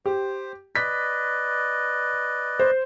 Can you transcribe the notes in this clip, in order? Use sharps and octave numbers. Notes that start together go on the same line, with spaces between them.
G4 C5
B4 D5 D#5 B6
C5